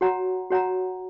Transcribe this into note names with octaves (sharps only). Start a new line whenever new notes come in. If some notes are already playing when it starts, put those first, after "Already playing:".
F#4 C#5 F#5 A#5
F#4 C#5 F#5 A#5